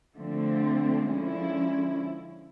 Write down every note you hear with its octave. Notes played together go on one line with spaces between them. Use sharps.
D3 F3 A3 C4
D3 F3 G#3 C#4 E4